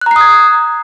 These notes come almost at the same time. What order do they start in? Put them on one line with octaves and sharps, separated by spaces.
F#6 A#5 C7 D#6 G#6